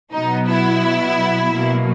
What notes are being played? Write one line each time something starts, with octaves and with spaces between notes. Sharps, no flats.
B2 F#3 B3 D#4
E4
B2 F#3 A#3